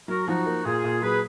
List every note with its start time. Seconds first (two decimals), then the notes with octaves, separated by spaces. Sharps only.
0.08 F#3 F#4 A#4
0.27 F3 D#4 F#4
0.46 A#3
0.65 A#2 F4 G#4
0.84 A#2
1.02 F#3 G#4 B4